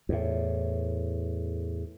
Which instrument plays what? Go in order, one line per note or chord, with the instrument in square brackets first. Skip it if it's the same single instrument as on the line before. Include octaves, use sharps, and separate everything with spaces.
[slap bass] E2 A2